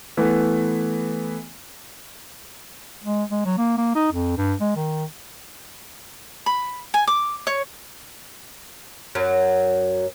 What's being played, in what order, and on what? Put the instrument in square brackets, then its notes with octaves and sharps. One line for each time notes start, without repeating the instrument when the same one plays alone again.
[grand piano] E3 A3 B3
[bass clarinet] G#3
G#3
F#3
A#3
A#3
D#4
F2
G2
G#3
D#3
[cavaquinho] B5
G#5
D6
C#5
[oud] F#2 F#3